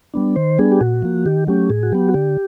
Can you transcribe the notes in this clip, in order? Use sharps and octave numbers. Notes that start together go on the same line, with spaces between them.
G3 B3 D4
D#3 C5
G3 B3 D4 G#4
G4
A#2 F#4
F3 A#3
D#3 G4
F#3 A3 C#4 G4
A2 G#4
F#4
F#3 B3 G4
F#4
D3 G4